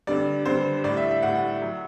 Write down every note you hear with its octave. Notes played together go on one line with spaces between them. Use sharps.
G2 D3 G3 D5
G2 D3 G3 C5
A2 G3 D5
E5
E5
A2 G3 F#5
F#3